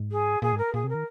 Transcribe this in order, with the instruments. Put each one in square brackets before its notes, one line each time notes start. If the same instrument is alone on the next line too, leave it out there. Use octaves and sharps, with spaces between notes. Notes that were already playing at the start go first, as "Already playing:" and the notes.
Already playing: [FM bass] G#2
[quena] G#4
[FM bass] A#2 [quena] G#4
[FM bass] G#2
[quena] A#4
[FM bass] A#2 [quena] G#4
[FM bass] C3
[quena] A#4
[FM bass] D#3